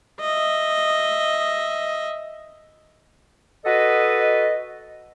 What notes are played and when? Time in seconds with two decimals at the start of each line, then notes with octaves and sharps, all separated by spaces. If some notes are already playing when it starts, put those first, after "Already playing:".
0.20 D#5 E5
3.65 F#4 A4 B4 D#5